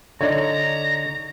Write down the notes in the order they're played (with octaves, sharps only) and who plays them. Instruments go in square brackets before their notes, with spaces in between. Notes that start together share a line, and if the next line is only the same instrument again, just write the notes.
[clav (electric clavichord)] D3 D#4 [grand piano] C#5 D5 [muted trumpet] A#5